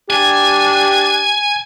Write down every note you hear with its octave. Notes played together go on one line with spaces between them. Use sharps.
D4 G4 G#5